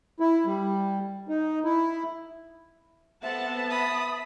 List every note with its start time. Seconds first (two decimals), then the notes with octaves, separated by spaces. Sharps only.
0.20 E4
0.46 G3
1.29 D#4
1.65 E4
3.23 B3 C4 A4 E5 F#5 A5
3.70 B5 D#6